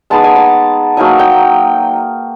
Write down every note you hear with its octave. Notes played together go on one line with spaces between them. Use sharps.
G#3 B3 D#4 A5
G#5
A5
F#3 A#3 D#4 G#5
G5